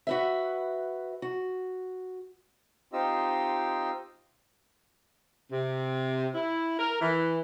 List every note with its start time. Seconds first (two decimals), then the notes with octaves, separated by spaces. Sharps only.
0.07 F#4 B4 E5
1.22 F#4
2.93 C4 D#4 F4 G4 D#5 E6
5.51 C3
6.34 E4
6.77 A#4
7.00 E3